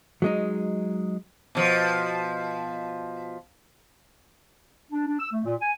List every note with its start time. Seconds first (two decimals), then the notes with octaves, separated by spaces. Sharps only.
0.22 F#3 G#3 D#4
1.55 B2 F3
4.91 D4
5.07 D4
5.19 E6
5.32 A3
5.45 A#2
5.61 G#5